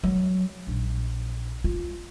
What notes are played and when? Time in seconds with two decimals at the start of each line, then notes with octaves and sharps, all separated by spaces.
0.03 F#3
0.67 A#1
1.64 F4